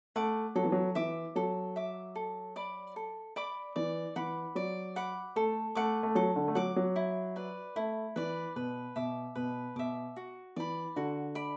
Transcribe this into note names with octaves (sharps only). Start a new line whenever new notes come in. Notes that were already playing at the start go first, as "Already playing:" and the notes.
A3 F#5 D6
F#3 A4
E3
F#3
E3 E5 D6
F#3 A4
E5 D6
A4
D5 B5 D6
A4
D5 B5 D6
E3 D5
E3 F#5 B5 D6
F#3 D5
F#5 B5 D6
A3 A4
A3 F#5 D6
A3
F#3 A4
D3
A3
F#3 F#5 D6
F#3
E4
B4 D5
A3 E4
E3 B4 D5
B2 B4
B2 E5 D6
B2 B4
B2 E5 D6
F#4
E3 D5 B5
D3 F#4
D5 B5